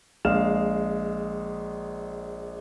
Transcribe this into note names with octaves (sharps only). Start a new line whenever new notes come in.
A#1 G#3 F5 F6 E7